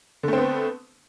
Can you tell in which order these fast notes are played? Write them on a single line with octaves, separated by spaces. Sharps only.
D3 A3 C4 B3